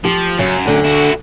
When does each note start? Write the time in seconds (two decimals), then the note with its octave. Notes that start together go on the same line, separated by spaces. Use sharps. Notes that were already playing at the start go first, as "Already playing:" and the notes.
0.05 F3 G4
0.38 F#2 C#3 F#3
0.66 D2 D3
0.85 E4 F#4